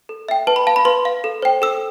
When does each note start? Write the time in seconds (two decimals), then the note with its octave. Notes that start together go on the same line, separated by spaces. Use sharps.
0.09 A4
0.29 E5 G5
0.47 B4 A5
0.56 B5
0.67 F5 A5
0.76 B5
0.85 B4 C6
1.05 F5
1.24 A4
1.42 C5 G5
1.62 A4 E6